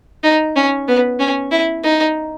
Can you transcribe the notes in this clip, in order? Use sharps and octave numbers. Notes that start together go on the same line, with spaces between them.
D#4
C#4
B3
C#4
E4
D#4